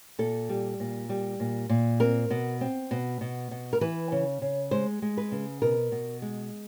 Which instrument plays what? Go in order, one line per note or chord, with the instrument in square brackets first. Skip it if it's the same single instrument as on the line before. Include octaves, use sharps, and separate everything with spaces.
[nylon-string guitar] A#2 A4
G3
A#2
G3
A#2
A#2
C4 A#4
B2
C4
B2
B2
B2
A#4
E3 B4
C#3
C#3
G#3 C5
G#3
B4
C#3
B2 A#4
B2
G#3